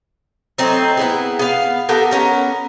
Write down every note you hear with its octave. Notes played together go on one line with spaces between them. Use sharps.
F#3 A3 C4 D#4
B3 E4 G#4
B3 F5
B3 G4 A4 A#4
B3 C#4 A#4